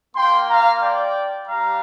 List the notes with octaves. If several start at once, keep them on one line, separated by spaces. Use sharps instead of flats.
A#3 F4 G5 C6
F5 A#5
D5 G5
G3 D4 G4 F5 A#5